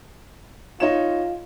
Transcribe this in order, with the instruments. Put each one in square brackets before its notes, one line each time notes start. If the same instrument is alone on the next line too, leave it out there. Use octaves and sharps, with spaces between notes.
[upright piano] D#4 C#5 E7 [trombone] F4